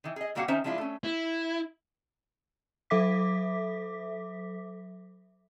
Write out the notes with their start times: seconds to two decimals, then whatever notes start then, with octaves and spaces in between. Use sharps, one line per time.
0.04 D#3 E3
0.16 G#4 D#5
0.35 A#2 G3 A#3 F#4 F5 F#5
0.48 D#3 C#4 D#4 C5 E5
0.64 F3 G#3 D4 E4 F4
0.78 A3 C#4
1.04 E4
2.90 F#3 A4 E5 D6 B6